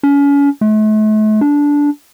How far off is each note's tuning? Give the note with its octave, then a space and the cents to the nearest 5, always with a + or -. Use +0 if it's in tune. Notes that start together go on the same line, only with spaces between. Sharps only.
C#4 +35
A3 -40
D4 -15